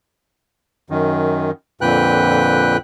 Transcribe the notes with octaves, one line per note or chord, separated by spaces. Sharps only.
F#2 D#3
F2 A#2 D3 B4 G5 F#6